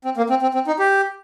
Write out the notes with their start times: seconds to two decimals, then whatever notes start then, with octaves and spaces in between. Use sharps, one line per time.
0.05 C4
0.17 A#3
0.30 C4
0.42 C4
0.54 C4
0.67 D#4
0.79 G4